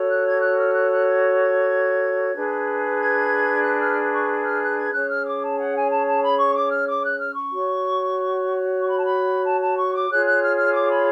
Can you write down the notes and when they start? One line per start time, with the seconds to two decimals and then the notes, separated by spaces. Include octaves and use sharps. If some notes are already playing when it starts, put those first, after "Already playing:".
Already playing: F#4 A4 C#5
0.09 F#6
0.25 G#6
0.41 F#6
0.58 F6
0.73 F#6
0.89 F#6
1.05 G#6
2.34 D4 G#4 B4
3.00 G#6
3.63 F#6
3.80 F6
4.12 C#6
4.45 F6
4.61 F#6
4.76 G#6
4.92 C#4 G#4 C#5 F#6
5.08 F6
5.25 D6
5.42 A5
5.57 F#5
5.74 G#5
5.90 A5
6.06 A5
6.22 B5
6.37 C#6
6.54 D6
6.70 F6
6.86 D6
7.03 F#6
7.19 F6
7.35 C#6
7.51 F#4 C#5
8.80 C#6
8.88 B5
8.97 A5
9.04 B5
9.45 A5
9.61 A5
9.76 C#6
9.93 D6
10.09 F4 G#4 C#5 F#6
10.25 F#6
10.41 F6
10.57 F6
10.73 D6
10.89 B5